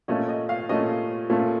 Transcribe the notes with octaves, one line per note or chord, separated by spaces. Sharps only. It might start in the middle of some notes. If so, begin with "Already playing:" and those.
A#2 A3 C#4 D#5
D#5
F5
A#2 A3 C#4 D#5
A#2 A3 C#4